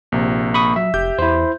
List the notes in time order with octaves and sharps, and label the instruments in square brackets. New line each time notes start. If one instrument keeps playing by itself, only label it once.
[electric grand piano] A#1 C3 [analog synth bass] A#3
[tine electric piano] B5 C#6 D#6
[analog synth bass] F#3 [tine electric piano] E5
[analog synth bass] F1 [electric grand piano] G4 G6
[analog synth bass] E2 [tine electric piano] E4 C5